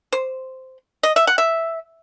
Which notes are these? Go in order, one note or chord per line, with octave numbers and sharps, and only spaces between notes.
C5
D#5
E5
F#5
E5